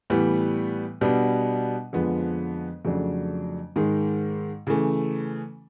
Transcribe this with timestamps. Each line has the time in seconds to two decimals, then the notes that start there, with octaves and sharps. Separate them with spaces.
0.10 A2 E3 G3 B3
1.01 B2 G3 B3 D4
1.93 F2 D3 F3 G#3 B3
2.85 F2 C#3 F#3 A3 D4
3.76 G#2 D#3 G#3
4.67 C#3 E3 A3